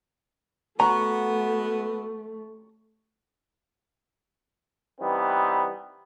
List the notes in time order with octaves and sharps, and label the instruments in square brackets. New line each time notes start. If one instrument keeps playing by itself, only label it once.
[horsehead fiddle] A3 [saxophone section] B3 F#4 [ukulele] A#5 [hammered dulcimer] C#6
[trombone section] E3 G3 B3 C4 D#4